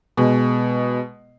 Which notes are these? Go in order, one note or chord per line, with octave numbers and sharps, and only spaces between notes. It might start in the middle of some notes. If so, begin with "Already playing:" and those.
B2 G#3